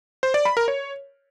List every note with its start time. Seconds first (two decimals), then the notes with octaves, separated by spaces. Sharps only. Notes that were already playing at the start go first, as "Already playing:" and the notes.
0.23 C5
0.34 D5
0.45 B5
0.57 A#4
0.68 C#5